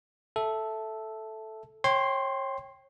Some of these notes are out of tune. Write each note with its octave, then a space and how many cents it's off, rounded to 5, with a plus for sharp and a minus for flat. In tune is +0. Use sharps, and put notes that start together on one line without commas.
A4 -5 E5 +0
C#5 -30 G5 +0 C6 +0